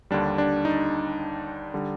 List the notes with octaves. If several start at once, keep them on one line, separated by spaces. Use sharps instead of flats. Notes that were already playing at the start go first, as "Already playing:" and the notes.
D#2 D3 G3 D4
D4
D#4
D3 G3